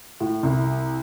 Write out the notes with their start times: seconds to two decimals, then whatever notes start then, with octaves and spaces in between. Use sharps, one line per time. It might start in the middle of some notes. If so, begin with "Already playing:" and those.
0.20 A2
0.43 C2